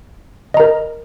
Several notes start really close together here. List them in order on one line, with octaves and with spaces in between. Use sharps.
D#5 A#5 A#4